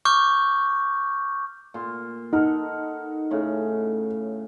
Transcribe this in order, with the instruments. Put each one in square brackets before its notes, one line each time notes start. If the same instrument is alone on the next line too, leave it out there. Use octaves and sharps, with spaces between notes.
[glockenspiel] C#6 D6 F6 G6
[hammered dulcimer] A#2 C6
[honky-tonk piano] D#4 [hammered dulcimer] A4 A#4 F#5
[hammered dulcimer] A2 C#3